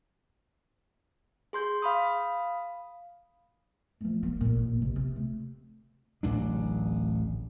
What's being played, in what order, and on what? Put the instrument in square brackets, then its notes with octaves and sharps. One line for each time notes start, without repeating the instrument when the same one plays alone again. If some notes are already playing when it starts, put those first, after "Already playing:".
[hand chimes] G#4 C6 G6
F5 B5 D#6
[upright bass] F3 A3
F#3 A#3
A1 A#2
D#2 C3
C3
A3
[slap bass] D1 A1 C3 D4